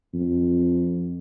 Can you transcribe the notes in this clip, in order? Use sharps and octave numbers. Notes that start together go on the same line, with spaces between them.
F2